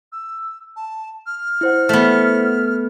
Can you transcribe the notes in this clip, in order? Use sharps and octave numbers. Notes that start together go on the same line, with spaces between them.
E6
A5
F6
E4 C5 F#5
A3 B3